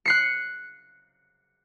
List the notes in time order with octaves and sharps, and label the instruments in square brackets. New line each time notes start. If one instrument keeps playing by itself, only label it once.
[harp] F#6 C7 C#7